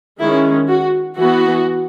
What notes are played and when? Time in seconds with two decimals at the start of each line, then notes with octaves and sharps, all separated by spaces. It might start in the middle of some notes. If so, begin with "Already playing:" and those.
0.19 D#3 G#3 C#4 E4
0.69 F#4
1.17 E3 B3 F#4